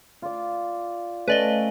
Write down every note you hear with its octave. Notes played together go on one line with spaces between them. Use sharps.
F4 D5
A3 C#4 F4 B4 D5 D#5